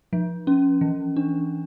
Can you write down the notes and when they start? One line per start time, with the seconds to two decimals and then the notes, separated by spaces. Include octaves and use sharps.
0.13 F3
0.47 C#4
0.81 E3
1.16 D4